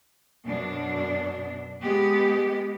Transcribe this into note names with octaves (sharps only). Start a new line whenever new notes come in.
F#2 B2 D4
G#3 B3 G4